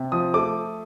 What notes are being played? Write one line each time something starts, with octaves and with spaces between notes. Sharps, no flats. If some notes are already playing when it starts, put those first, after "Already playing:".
Already playing: C3
F3 D#6
A3 D6